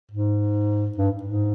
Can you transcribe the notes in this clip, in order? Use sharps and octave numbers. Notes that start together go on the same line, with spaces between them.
G#2
G2
G#2